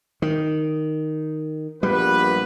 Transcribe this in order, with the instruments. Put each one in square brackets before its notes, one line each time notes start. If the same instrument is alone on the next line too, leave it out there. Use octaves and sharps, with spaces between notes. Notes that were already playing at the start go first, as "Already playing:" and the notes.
[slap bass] D#3
[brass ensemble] A#1 B3 B4 [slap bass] G3